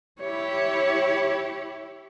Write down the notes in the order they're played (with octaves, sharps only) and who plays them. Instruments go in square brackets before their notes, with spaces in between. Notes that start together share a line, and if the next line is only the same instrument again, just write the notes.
[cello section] E4 G4 [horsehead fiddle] C#5